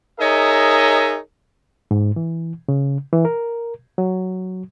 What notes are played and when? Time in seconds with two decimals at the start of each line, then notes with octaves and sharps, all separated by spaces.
0.20 D#4 G#4 A#4 C#5 D#5 E5
1.91 G#2
2.16 E3
2.69 C#3
3.13 E3
3.25 A#4
3.98 F#3